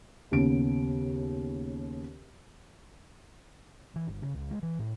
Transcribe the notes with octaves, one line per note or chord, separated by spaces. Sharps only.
D#2 C#3 B3 D7
E3
G1
C#3
C#2
G#3
E3
A2